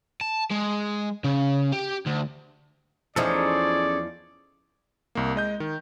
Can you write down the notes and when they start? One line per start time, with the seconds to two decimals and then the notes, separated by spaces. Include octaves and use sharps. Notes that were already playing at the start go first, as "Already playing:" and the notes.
0.21 A5
0.51 G#3
1.24 C#3
1.72 G4
2.06 D2
3.16 E2 F3 C#4 D#4 G#4 A4 D5
5.15 C2 A#3
5.35 G#3 D#5 G6
5.60 D#3